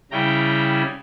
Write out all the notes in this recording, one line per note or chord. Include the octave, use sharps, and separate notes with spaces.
C#3 G3 C#4 E4 G5 A#5